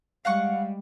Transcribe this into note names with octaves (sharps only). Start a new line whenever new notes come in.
G3 G#3 F5 F#5 C#6